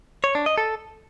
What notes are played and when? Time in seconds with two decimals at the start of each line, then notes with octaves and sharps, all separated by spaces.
0.24 C#5
0.35 D4
0.46 D#5
0.58 A4